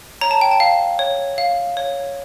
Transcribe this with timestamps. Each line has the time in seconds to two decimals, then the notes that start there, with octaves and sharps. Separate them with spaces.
0.21 C#5 A#5
0.31 A5
0.41 G5
0.51 A5
0.60 F5
0.99 C#5
1.38 F5
1.77 C#5